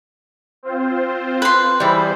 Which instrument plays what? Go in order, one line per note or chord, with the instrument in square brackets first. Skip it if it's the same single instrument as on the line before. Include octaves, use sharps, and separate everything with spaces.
[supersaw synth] C4 F4 C5
[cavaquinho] B4 C6
[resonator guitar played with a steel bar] E3 G3 [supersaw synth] G#4 C5